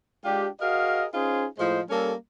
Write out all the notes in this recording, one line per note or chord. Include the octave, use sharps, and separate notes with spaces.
G#3 D4 F4 G4
F#4 G#4 A#4 D#5 F5
C#4 D#4 F4 G#4 C5
A2 F3 G#3 C5 D#5
G3 A#3 C#4 A4